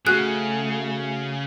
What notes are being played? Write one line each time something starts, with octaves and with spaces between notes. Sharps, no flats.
C#3 A3 F#4 G#4 F#6